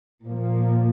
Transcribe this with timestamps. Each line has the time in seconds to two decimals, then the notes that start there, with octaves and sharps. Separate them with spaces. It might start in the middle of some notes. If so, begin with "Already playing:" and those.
0.24 A#2 F3 A#3